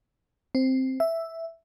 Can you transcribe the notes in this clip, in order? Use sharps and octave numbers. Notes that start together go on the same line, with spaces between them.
C4
E5